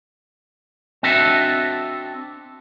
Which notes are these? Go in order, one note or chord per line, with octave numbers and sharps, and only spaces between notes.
C4 D4 F#4 A4 D#5 E5